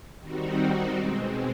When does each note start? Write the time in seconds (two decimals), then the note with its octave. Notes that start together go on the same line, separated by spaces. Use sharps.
0.20 D#3 G3 C4 D#4 F#4
0.96 B2 G#3 C4